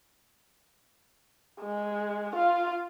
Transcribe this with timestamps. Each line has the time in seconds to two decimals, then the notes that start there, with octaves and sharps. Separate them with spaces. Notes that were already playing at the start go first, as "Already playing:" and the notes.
1.61 G#3
2.33 F4 F5